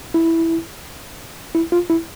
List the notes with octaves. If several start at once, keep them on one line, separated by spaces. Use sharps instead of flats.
E4
E4
F4
E4